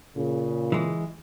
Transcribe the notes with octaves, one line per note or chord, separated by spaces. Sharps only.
A#2 C#3
E3 G#3